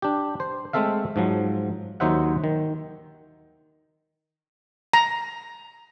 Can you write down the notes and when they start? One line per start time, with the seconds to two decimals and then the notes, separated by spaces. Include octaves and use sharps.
0.02 D4 G4
0.40 C5
0.73 G#3 A3 C4 A4 E5 F5
1.16 G#2 F3 F#3
2.00 D#2 F#3 D#4 C5 E5 F#5
2.44 D#3
4.93 A#5